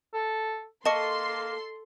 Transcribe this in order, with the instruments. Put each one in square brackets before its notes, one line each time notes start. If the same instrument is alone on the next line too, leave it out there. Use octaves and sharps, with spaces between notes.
[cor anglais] A4
[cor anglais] A#3 [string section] A4 C6 [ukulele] D#5 [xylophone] A5 C#6 C#7